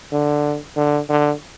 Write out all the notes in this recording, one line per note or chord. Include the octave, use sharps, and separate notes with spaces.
D3
D3
D3